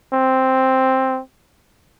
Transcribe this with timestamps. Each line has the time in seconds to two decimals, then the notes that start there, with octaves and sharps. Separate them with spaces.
0.13 C4